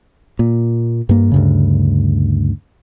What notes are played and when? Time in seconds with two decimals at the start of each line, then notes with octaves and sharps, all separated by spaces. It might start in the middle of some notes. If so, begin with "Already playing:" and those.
0.39 A#2
1.09 G2 A#3
1.32 D2 G2 C#3